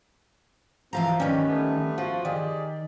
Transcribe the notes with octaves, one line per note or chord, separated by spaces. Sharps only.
E3 F3 C4 F5 A#5
D#3 C#4 G4 B4 D5
G3 A3 B3
F3 F#4
D#3 G4 G#4 D5